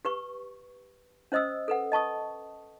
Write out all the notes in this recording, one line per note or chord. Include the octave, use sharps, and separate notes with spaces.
G4 B4 C#6
C#4 C5 D#5 D#6 E6
A4 B4 F#5
D#5 A5 C#6 D#6